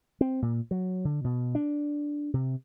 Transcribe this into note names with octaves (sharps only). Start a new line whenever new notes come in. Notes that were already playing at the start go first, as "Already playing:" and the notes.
C4
A#2
F#3
D3
B2
D4
C3